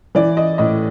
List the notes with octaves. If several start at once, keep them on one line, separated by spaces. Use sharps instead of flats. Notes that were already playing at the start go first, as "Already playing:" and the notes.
E3 D5
D#5
A2 D#5